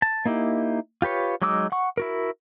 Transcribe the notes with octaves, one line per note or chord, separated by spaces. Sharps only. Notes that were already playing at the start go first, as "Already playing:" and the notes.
A5
A#3 D#4 E4 G4
F4 G4 B4 C#5
F#3 G#3 D#4 D6 E6
F#5 C#6
E4 F#4 A#4